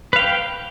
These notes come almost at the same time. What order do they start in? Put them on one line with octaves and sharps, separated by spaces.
B4 F5 G5